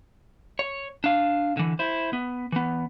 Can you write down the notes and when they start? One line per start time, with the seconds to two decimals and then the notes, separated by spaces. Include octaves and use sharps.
0.59 C#5
1.04 D4 F5
1.57 D3 E3
1.79 E4 C5
2.13 B3
2.52 E3 B3